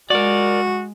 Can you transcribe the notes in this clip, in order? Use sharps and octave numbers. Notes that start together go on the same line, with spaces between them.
G#3 F#4 A#4 D5